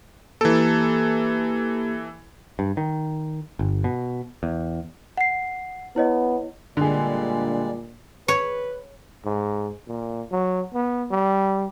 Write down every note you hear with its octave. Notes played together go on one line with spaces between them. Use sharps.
E3 A#3 G4 A4
G2
D#3
G1
B2
E2
F#5 C7
B3 E4 C#5 D#5
A#2 D3 G3 G#3 G#4 D5
B4 C#5
G#2
A#2
F#3
B3
G3